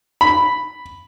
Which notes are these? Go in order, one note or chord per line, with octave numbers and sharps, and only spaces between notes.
B5